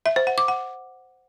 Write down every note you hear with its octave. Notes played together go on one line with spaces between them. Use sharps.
E5
C5
F#5
D6
F#5